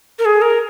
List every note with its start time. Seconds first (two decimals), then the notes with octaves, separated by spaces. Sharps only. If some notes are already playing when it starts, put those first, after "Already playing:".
0.19 A#4
0.25 G#4
0.42 A#4